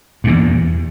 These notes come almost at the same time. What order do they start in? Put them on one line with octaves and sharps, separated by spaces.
G2 A#2 E2